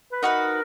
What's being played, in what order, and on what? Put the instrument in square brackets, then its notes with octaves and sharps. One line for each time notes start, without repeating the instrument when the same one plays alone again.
[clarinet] B4
[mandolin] D#4 F#4 B4 [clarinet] A#4